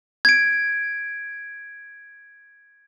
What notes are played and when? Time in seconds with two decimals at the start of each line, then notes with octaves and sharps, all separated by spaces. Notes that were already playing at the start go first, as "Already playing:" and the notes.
0.25 G#6 D7